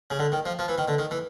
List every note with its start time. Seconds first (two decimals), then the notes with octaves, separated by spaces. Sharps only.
0.11 C#3
0.19 D3
0.32 D#3
0.46 F3
0.59 F3
0.68 E3
0.78 D#3
0.88 D3
0.99 D#3
1.11 E3